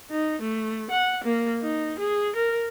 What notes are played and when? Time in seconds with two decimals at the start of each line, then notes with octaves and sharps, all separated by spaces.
0.10 D#4
0.42 A3
0.91 F#5
1.24 A#3
1.61 D#4
1.99 G#4
2.36 A#4